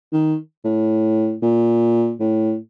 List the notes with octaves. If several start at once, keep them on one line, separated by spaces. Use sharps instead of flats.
D#3
A2
A#2
A2